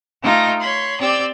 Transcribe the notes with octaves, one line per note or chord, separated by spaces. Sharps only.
A3 D#4 F4 G5 A#6
C#5 B5 C6
C4 G4 D5 G5 E6